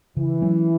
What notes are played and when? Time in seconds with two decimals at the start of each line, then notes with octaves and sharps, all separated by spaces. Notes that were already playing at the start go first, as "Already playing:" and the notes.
0.17 C#3 E3
0.42 F#3 A3 C#4